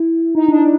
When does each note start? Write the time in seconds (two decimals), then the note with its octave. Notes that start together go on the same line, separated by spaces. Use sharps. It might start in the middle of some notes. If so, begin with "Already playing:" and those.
Already playing: E4
0.35 D#4
0.48 D4